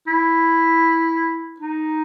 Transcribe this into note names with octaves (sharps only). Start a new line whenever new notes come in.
E4
D#4